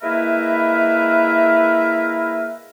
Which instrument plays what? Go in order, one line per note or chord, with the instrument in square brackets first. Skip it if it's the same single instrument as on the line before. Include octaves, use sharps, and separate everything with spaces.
[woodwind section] G#3 A#3 E4 A#4 B4 E5